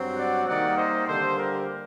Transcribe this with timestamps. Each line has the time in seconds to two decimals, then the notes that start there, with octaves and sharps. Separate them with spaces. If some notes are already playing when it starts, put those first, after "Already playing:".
Already playing: G2 F#3 C4
0.15 D5 F#5
0.46 C3 D#3 G3 A#3 D5 F#5
0.76 C5 D#5
1.07 D3 G3 A#3 A4 C5
1.38 G4 A#4